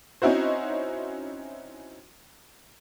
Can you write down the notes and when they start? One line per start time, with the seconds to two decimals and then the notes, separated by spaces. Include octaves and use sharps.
0.22 C4 C#4 D#4 E4 F#4 C5